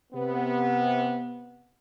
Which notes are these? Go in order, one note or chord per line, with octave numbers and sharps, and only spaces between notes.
C3 B3